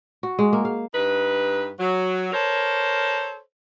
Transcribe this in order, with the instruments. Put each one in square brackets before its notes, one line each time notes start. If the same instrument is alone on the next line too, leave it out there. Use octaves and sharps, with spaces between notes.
[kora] F#4
G#3
A#3
F5
[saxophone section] G2 D#4 B4
F#3
A4 A#4 C5 C#5